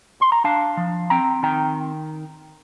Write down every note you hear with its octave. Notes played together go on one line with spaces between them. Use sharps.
C6
A#5
D4 F5 A5
F3
C4 G5 A#5
D#3 G5 A#5